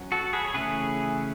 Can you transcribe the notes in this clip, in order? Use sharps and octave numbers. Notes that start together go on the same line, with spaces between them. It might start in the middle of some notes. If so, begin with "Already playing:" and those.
Already playing: F#3 C#4
F#4 A4
G#4 B4
C#5
C#3 E3 A3 C#4 G#4 B4